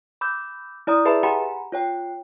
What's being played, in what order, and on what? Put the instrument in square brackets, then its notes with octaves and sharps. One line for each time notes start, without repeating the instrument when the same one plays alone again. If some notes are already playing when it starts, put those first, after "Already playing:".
[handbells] B5 D6 E6 G6
E4 D5 A#5 D#6
G#4 B4 E5 A5 B5
G4 F#5 G#5 A#5 B5
F4 C#5 G5